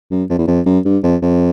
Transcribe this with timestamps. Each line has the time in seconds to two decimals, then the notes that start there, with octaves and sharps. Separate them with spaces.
0.11 F#2
0.30 F2
0.39 E2
0.47 F2
0.66 F#2
0.85 G2
1.03 F2
1.22 F2